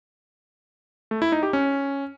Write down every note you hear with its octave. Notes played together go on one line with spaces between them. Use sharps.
A3
E4
D#4
G4
C#4